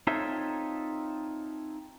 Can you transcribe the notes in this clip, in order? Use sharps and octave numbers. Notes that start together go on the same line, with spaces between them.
C4 D#4 F4 A4 C#5 E5